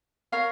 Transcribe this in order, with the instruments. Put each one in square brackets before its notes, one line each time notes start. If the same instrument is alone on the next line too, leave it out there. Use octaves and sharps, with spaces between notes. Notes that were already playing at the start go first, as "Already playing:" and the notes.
[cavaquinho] A#4 C#5 F5